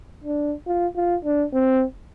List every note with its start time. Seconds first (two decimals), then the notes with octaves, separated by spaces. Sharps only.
0.24 D4
0.67 F4
0.96 F4
1.25 D4
1.53 C4